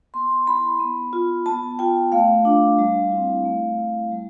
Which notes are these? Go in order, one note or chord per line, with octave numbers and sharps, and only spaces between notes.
B3 C6
E4 B5
B3
F4
B3 A5
F4 G5
A3 F5
D4 F4
G3
C4 E4
A3
E4
G3